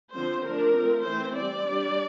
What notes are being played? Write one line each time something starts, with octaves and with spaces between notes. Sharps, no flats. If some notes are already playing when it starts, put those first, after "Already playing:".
D3 F3 C4 C5
F3 A3 D4 A#4
F3 A3 C4
E3 A3 C4 C5
G3 C4 D5
G3 D4